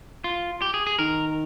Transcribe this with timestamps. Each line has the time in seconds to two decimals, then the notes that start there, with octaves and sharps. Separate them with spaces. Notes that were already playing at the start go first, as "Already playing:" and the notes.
0.24 F4
0.62 G4
0.74 G#4
0.87 G#4
0.99 D#3 A#4